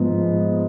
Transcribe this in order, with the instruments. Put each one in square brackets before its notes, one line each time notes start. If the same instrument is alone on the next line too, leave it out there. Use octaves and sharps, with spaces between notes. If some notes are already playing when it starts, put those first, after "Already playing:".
Already playing: [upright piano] G#2 F3 B3